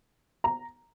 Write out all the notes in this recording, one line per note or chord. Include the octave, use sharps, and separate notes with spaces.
A#5